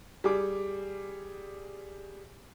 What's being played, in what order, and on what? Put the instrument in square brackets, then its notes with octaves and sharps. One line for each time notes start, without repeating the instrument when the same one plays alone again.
[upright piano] G3 G#4 D6